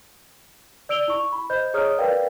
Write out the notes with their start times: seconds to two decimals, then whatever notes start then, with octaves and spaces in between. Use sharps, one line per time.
0.89 D5 E6 D7 F7 G7
1.08 E4 C#6
1.32 B5
1.50 C5 D#5 G6
1.74 G#4 C#5 D#5 A#5 D#6 F6
1.98 A#4 B4 D5 F5 G5